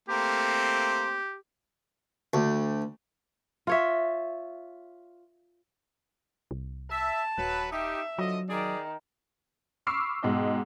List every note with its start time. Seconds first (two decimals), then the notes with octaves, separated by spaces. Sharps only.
0.09 A3 A#3 C4 G4
2.34 D2
3.67 F4 C#5 E5
6.51 C2
6.92 E5 A5
7.38 D#1 F#3 B4
7.72 D#4 G4 E5
8.19 D3 F3 F#3 D#5
8.50 D#3 G#4 D5
9.87 B5 C#6 D6 E6 F6 C7
10.23 G#2 B2 D#5 G5